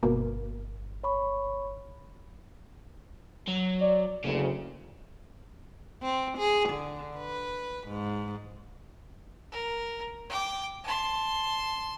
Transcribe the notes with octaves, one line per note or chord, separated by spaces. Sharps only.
G1 B2 A#3
C#5 B5 C#6
F#3
D5
F#1 D2 C#3
C4
G#4
D3
B4
G#2
A#4
G5 D6
A5 C6